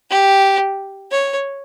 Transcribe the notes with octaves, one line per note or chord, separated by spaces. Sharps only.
G4
C#5